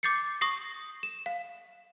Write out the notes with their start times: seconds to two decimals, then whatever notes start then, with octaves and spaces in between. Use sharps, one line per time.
0.03 D6 G6 A6 C7 C#7
0.41 C#6 D#6 A#6 C7
1.03 E7
1.26 F5